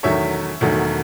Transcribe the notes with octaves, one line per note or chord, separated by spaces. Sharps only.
E1 E2 D#3 F#3 A3 C#5 E5
E1 E2 D#3 F#3 A3